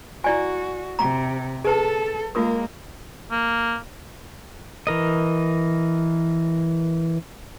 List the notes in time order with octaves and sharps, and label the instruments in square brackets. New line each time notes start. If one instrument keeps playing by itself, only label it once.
[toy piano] E4 D5 G#5 [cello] F#4
[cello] C3 [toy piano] A#5
[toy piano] G#4 B4 A5 [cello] A4
[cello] G#3 A#3 [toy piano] F4 A#4 D#6
[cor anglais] A#3
[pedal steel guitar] E3 A#4 D#5